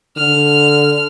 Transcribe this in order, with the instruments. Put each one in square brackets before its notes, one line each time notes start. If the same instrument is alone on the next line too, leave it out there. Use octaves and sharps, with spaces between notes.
[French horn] D3 [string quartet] F6